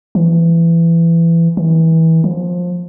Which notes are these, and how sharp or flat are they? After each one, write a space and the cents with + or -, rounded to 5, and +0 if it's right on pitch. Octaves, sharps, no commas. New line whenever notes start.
E3 +20
E3 -25
F3 +20